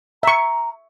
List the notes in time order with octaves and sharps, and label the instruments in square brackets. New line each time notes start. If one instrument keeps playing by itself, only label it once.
[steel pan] E5 C#6 [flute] A#5